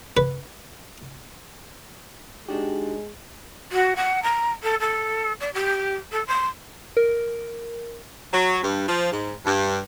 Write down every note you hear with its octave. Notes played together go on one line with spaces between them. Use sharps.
B4
G#3 D4 D#4 F#4 G4
F#4
F#5
A#5
A4
A4
D5
G4
A4
C6
A#4
F#3
G2
F3
G#2
G2